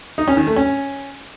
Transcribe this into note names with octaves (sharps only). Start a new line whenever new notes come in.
D#4
C#4
D#3
A3
C#4